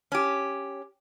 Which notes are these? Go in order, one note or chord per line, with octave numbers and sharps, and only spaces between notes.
C#4 G4